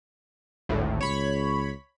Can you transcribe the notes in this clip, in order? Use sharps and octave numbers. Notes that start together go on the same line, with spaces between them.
G#1 D2 A2
C#2 C#5 B5